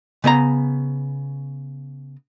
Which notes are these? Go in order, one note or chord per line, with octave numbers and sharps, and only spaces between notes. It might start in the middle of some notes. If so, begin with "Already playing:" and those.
C#3 B3 D#5 A#5